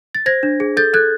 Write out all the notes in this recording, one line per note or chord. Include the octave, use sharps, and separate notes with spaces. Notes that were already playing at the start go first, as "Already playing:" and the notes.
A6
C5 G#6 A#6
D4
G#4
A4 G6 A6
A4 F#6 G#6